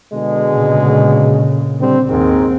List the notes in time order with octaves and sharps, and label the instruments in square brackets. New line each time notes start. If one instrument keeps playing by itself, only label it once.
[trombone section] B2 D3 G#3
[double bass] A#2 C#3
[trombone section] D3 G3 C4
[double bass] D#2 C4 [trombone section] G#2 D#3